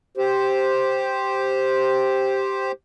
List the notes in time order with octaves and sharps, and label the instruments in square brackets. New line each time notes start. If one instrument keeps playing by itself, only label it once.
[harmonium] G4 C5